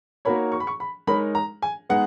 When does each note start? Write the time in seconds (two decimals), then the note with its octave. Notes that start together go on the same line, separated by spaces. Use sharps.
0.25 A#3 D#4 F#4 A#4 C#5 B5
0.52 C#6
0.60 B5
0.67 C#6
0.80 B5
1.07 G#3 D#4 A#4 C#5 B5
1.35 A#5
1.62 G#5
1.89 G#3 B3 D#4 G#4 F#5